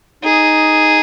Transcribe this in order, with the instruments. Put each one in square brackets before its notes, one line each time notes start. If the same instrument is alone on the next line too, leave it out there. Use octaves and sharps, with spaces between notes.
[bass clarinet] D#4 [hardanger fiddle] G#4